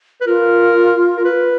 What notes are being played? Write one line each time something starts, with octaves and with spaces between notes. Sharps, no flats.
B4
F4 A#4
A#4
B4